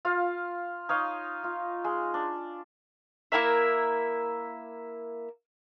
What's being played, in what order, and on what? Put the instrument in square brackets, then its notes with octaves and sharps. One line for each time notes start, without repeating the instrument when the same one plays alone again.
[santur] F4 F5
D#4 C#5 F5 D#6
F4
G#3
D4
[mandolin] A#3 E4 A#4 E5